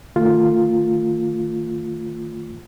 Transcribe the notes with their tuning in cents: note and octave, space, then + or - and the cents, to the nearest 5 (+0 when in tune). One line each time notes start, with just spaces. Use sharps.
D#3 +0 A3 +35 F4 +0